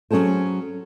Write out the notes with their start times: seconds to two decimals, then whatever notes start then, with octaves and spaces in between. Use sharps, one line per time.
0.11 F#3 C#4 G#4 A4 C5